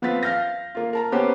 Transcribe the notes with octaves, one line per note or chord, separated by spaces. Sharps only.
F3 B3 C4 F4 A6 B6
F5 F6 G6 A#6
A#3 F4
A#4 A5 A#5
B3 C#4 G4 C5